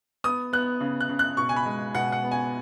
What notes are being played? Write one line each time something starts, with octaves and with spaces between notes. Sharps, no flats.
B3 D#6
B3 F#6
C#3
F#6
C#3
F#6
B2 C#6
G#5
B5
G#3
B2 F#5
F#5
B3
G#5